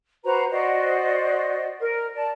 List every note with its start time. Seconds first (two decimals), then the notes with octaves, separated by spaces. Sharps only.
0.24 F#4 B4 C5 A#5
0.50 F#4 C5 D5 D#5
1.80 A#4
2.14 D5 A5